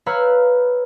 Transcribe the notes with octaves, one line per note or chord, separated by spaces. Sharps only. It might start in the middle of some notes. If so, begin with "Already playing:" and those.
B4 C#5 F5 A#5 B5 E6